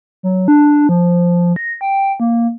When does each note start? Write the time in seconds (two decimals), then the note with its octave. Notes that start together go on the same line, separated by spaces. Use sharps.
0.23 F#3
0.48 D4
0.89 F3
1.56 A#6
1.81 G5
2.20 A#3